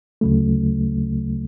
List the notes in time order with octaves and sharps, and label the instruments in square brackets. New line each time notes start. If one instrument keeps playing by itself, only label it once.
[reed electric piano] D2 C#3 F#3 A3